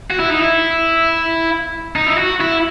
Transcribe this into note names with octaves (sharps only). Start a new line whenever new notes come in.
F#4
E4
D#4
E4
D#4
E4
F#4
E4